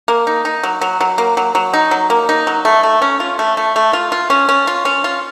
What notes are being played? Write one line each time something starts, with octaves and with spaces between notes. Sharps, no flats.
A#3
D#4
D#4
F#3
F#3
F#3
A#3
F#3
F#3
D#4
F#3
A#3
D#4
F#3
A3
A3
C#4
F4
A3
A3
A3
F4
F4
C#4
C#4
F4
C#4
F4